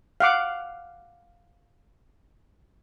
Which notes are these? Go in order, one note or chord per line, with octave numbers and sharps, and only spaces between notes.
F5 F#5 D6